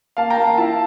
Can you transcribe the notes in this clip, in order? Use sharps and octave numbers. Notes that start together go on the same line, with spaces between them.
A#3 F5 A5
G5 A#5
A#3
F5 A5
E4 F5 A5